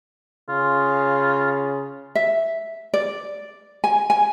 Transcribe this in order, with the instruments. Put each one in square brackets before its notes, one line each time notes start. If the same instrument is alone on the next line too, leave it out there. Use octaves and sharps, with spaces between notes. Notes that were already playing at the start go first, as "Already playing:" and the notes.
[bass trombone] C#3 [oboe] F4
[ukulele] E5
D5
G#5
G#5